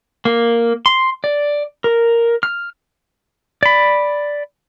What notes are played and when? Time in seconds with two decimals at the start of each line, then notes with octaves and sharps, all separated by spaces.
0.25 A#3
0.86 C6
1.24 D5
1.84 A#4
2.43 F6
3.63 D5 B5